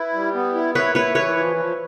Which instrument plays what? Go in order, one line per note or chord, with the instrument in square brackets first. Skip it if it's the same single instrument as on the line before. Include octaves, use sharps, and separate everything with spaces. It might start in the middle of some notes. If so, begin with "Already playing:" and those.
Already playing: [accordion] E4 [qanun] B4
[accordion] G3
B3
E4
[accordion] E4 [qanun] B4 C#5
[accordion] E4 [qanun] B4 C#5
[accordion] E3 [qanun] B4 C#5
[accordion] F3
F3